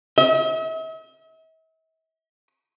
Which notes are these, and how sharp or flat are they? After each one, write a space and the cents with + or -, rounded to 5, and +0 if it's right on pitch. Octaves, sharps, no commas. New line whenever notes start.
E5 -45